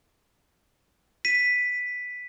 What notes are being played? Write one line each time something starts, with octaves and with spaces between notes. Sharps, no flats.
B6 D#7